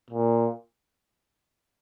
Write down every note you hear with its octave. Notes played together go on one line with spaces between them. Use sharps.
A#2